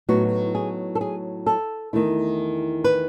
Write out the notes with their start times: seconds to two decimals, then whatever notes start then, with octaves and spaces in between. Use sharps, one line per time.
0.09 A2 F#3 B3 D#4 F#4
0.55 G#4
0.95 A4
1.01 G#4
1.46 A4
1.93 E2 D#3 A3 E4
2.84 B4